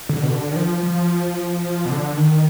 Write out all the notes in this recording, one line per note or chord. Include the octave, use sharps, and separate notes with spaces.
D3
B2
D3
D#3
F3
F3
B2
D3
D#3